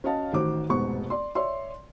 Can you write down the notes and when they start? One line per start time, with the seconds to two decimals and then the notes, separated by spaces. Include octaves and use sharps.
0.04 C#4 F#4 C#5 D#5 F5 A5
0.32 A1 D#3 F#4 C5 D6
0.69 F1 G#2 B2 B3 C5 C#6
1.10 D5 C6
1.35 C#5 D5 E5 C6